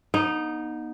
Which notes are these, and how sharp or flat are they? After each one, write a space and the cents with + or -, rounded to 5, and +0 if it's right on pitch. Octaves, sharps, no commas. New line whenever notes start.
B3 -35 D#4 -5